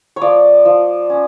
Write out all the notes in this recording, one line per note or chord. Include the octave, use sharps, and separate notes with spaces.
C#5
F3 D5
F3
C#4